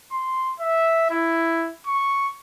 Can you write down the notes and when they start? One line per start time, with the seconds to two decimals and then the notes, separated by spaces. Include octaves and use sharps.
0.11 C6
0.60 E5
1.10 E4
1.87 C#6